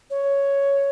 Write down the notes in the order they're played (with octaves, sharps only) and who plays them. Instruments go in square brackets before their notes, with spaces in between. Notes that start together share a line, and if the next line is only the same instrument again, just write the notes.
[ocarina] C#5